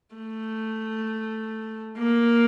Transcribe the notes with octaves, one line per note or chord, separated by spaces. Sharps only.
A3
A#3